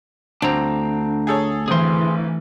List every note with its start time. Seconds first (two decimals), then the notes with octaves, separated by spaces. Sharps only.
0.42 D2 C4 D4 A#5
1.27 G#4 A4 C#5
1.68 G#1 E3 C4 G#4 C6